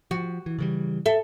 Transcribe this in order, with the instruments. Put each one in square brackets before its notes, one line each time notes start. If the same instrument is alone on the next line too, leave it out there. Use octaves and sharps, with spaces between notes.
[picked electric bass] F3 [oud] F#4
[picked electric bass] E3
C#3 E3 G3
[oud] A4 E5